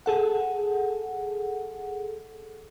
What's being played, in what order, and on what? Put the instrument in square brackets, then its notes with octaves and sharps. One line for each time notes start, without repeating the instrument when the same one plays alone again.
[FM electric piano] G#4 A4 F#5